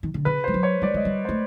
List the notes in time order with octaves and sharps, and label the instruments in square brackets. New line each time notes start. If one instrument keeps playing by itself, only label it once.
[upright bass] D#3
D3
[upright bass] C#3 [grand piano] B4
[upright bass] G3 [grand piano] C5
[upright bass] F#3
[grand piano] C#5
[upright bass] G3 [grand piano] D5
[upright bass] G#3 [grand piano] D#5
[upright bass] G3
[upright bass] A3 [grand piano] C5